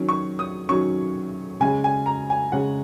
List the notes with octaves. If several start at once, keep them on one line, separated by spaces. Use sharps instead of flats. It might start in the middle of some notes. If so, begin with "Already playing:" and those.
Already playing: D#3 F#3 C#4
C#6
D#6
D#3 F#3 C#4 C#6
C#3 G#3 C#4 G#5
G#5
A#5
G#5
C#3 G#3 C#4 F#5